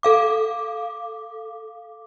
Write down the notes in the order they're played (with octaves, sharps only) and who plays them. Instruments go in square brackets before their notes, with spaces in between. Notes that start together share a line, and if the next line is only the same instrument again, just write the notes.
[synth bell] A4 F5 D6